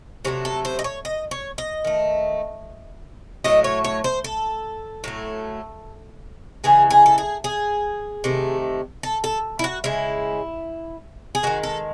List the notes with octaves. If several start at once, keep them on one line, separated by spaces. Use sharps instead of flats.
C3 F#3 A3 C#4
A4
C5
D#5
C#5
D#5
C#5
D#5
D#3 A3
A2 F#3 A3 D#5
C#5
C#5
C5
A4
A2 F#3 A3
C#3 E3 G#3 G#4
G#4
A4
G#4
G#4
C3 D#3 A3
A4
A4
E4
F#4
C#3 G#3 E4
G#4
D#3 G#3 F#4
A4